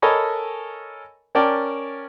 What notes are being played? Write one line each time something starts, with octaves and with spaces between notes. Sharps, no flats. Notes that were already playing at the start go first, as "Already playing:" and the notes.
A4 A#4 C#5 D#5 G#5 B5
C#4 A#4 D5 G5 A5